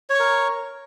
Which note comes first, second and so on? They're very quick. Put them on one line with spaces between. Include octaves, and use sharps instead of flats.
C#5 C#6 A#4